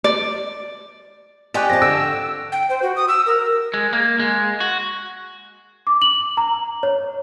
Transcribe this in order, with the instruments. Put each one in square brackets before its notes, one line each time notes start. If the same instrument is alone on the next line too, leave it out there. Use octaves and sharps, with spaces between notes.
[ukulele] D5
[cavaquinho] G4 G5 C#6 [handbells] D5 G#5 F#6 [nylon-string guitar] D#5
[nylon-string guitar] F2 A5 [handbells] A#6
[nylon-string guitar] D3 [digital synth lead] E6 [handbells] D7
[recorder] G5
C5
F#4
D#6
E6
A#4
[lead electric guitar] G#3
A#3
G#3
F#4
[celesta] D6
F#7
A#5
C#5